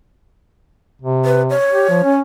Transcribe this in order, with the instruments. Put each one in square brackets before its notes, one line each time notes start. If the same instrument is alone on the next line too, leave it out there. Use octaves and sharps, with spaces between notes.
[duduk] C3
[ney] B4
C#5
[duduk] G4
F3
C#4